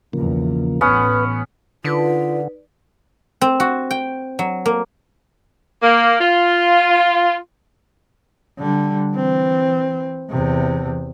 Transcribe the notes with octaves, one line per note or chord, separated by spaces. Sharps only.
B1 E2 C#3 F3 A#3
A1 B3 C#4 B4 F#5
D3 D#4 F4 B4 D5
C4
F#4
G5
F#3
A#3
A#3
F4
D3 G3
E3 C4
E2 C3